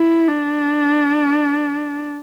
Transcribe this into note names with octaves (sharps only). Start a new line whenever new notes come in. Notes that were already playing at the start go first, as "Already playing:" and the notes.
Already playing: E4
D4